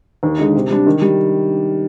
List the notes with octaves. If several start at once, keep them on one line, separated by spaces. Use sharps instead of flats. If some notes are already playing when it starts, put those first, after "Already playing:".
D#2
D3 G#3 D#4
C3
G3 D4
D#3
G3